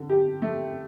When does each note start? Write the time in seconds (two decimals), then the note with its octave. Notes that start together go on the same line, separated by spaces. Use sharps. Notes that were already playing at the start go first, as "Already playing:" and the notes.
Already playing: D3
0.09 G4
0.42 A3